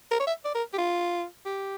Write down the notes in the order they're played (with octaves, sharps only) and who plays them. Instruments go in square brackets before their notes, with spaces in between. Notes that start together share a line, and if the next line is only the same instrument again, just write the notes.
[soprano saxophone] A#4
C#5
E5
D5
A#4
G4
F4
G4